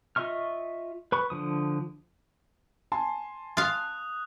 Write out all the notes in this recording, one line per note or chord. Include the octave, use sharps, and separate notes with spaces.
F4 D#5 E5 C#6 F6
B4 B5 C#6
D3 F3 D#6
G#5 A5 C6
F4 F5 D#6 F#6